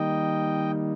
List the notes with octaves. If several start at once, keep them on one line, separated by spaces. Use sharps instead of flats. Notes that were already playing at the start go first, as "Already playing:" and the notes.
Already playing: D#3 G3 A#3 D#4 D#5 G5